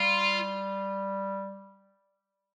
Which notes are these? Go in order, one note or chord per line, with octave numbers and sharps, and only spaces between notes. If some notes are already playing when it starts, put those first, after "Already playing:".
Already playing: G3 F4